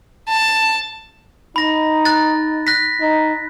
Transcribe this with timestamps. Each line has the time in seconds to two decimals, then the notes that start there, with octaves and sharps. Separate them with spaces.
0.28 A5
1.56 D#4 B5 A#6
2.05 F#6 A6
2.67 F#6 A#6 B6
3.00 D#4